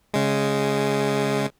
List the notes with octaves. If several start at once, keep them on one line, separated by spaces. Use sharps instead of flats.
C#3 G#3